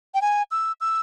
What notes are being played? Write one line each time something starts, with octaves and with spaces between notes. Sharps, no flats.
G5
G#5
E6
E6